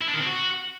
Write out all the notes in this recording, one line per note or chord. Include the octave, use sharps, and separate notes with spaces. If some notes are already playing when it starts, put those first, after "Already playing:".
E4
D4
D#3
C4
F#4